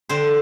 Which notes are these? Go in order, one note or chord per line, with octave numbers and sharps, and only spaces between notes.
D3 C5